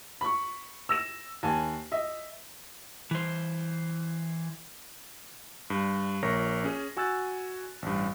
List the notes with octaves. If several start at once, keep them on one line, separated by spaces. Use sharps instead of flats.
B5 C#6
E6 A#6 E7
D#2 G#5 A5
D#5 E5
E3 C5
G2
A#1 A#4 C#5 C#6 A#6
C#4 G#4
F#4 G#5 E6 F#6 A6
A1 G2